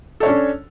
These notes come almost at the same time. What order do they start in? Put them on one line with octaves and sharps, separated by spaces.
A4 C#5 D4 C#4